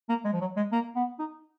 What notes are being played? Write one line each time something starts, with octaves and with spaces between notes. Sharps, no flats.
A#3
G#3
F3
F#3
G#3
A#3
B3
D#4